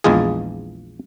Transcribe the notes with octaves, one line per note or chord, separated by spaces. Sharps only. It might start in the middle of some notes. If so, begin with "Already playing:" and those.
A#1 E2 G#3 F4 G#4